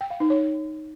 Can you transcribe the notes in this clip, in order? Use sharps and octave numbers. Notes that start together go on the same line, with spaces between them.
G5
F5
D#4
C#5